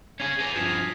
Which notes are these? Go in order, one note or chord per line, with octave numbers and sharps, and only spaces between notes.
C#4 G#4 G#6 C7
G#4 B4 A#6 D#7 F7
G2 F3 D#6 B6 E7